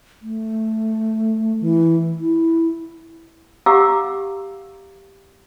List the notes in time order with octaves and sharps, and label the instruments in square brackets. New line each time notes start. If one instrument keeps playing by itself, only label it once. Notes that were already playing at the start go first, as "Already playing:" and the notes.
[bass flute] A3
E3
E4
[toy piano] G4 F5 F#5 A#5 D6 E6